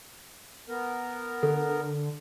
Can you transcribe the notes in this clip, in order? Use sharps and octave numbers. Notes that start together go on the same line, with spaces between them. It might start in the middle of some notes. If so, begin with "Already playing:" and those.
B3 A#4
D3 A4